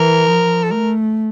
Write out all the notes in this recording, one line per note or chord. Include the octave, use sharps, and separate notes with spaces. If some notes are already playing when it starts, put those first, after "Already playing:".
Already playing: E3 A#4
F3
A4
A3 A#4